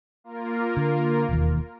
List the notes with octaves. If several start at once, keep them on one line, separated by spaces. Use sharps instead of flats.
A#3 F4 A#4
D3
E1 D#2